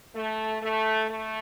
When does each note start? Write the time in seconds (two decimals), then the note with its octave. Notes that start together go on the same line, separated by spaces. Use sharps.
0.16 A3
0.62 A3
1.09 A3